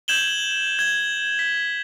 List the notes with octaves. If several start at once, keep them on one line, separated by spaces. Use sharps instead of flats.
G6 G#6 E7 F#7 G7
G#6 G7
B6